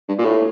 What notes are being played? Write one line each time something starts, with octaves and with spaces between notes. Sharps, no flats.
G2
A#2
A2